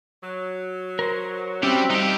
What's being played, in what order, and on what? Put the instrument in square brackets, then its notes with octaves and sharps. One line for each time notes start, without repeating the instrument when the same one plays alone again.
[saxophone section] F#3
[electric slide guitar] A#4 C5
[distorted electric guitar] G3 G4 [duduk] C4 [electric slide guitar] C#4 F#4 [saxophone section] E5
[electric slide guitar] G3 [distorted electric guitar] D#4 G4